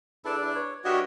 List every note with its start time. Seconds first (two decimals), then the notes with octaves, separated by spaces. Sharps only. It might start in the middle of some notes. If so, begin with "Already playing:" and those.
0.25 E2 D4 E4 A4
0.42 E4
0.55 B4 C#5
0.85 G2 G3 F#4 G4 A#4 C#5 D#5 E5